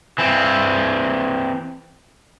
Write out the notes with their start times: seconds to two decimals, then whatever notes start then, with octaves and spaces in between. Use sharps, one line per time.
0.18 E3 C4